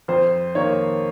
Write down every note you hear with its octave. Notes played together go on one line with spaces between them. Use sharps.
F2 C5
D#3 A#3 C#5